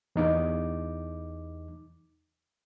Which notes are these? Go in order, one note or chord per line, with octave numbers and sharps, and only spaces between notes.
E2 D#4 D6